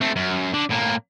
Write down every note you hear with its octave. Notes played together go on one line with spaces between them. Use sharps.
A3 C4
F#2
D3
A2 A#3